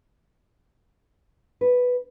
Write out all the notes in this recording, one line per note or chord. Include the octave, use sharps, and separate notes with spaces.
B4